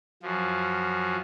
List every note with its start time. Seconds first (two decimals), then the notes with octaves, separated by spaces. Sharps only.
0.23 F#2 F3